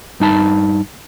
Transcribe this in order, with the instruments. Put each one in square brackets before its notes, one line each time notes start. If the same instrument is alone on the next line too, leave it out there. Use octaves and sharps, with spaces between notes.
[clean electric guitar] G2 D#4 A5 B5